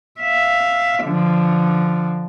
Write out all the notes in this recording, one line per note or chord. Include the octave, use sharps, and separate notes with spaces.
E5 F5
D3 F3